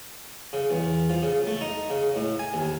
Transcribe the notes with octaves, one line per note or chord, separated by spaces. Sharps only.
C#3
E2
F3
C#3
A3
D#4
C#3
A2
G#5
D#2